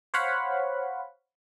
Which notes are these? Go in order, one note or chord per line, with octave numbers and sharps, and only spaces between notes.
C5 C#5 F5 F#5 B5